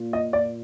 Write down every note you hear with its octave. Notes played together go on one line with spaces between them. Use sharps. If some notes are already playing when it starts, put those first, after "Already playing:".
Already playing: A#2
D#5
D5